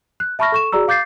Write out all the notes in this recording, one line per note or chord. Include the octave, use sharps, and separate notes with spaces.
F#6
E5 A5 B5 C#6 F6 A#6
A4 C#6 E7
F#4 G#4 D5 A#5 E6
F5 D6 G6 A6 C7